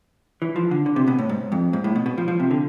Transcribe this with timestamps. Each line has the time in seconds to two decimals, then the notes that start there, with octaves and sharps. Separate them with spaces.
0.42 E3
0.56 F3
0.71 D3
0.86 D3
0.96 C3
1.08 B2
1.19 A2
1.29 G#2
1.52 F2
1.73 G#2
1.84 A2
1.96 B2
2.06 B2
2.18 F3
2.28 F3
2.40 C3
2.51 D3